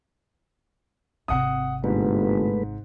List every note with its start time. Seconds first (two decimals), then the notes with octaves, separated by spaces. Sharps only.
1.28 G#1 C3 F#5 D#6
1.84 G1 G#2 G#3 A3 B4